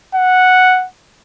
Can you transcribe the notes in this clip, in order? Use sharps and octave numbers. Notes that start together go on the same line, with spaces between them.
F#5